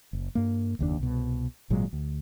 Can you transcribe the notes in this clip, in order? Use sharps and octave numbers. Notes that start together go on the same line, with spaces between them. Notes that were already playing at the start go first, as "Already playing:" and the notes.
F#1
G2 A#3
F#1 D#2 A#2 D4
C2 B2
G#1 A#2 F#3 G#3
D2